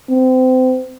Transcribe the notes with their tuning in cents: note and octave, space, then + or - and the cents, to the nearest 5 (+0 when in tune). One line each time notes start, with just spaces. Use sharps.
C4 -30